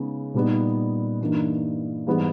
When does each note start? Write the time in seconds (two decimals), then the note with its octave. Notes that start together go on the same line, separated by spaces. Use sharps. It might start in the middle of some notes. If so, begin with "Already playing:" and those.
Already playing: C#3 G#3 B3 D#4
0.34 A#2 G3 B3 D#4
1.21 G2 E3 A#3 D#4
2.07 G#2 E3 G3 B3